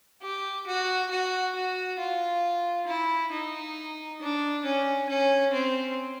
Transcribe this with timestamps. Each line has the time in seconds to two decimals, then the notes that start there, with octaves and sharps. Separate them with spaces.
0.22 G4
0.67 F#4
1.10 F#4
1.55 F#4
1.99 F4
2.87 E4
3.32 D#4
4.21 D4
4.65 C#4
5.09 C#4
5.53 C4